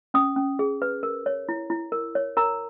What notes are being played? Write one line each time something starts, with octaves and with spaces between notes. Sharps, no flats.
C#4 D#6
C#4
G#4
B4
A#4
C#5
E4
E4
A#4
C#5
A#4 A#5